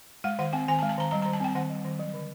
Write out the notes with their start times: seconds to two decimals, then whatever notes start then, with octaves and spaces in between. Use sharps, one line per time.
0.24 G#3 F#5
0.39 D#3 F#5
0.53 C4 G5
0.68 D#3 G#5
0.79 A5
0.83 G#3
0.89 A5
0.98 D#3 A#5
1.11 G3 A#5
1.22 A#5
1.26 D#3
1.33 A5
1.40 C4 G5
1.55 D#3 F#5
1.70 G3
1.85 D#3
1.99 F#3
2.14 D3